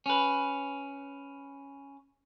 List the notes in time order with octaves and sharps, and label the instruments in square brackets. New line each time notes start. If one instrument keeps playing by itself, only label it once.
[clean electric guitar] C#4 B4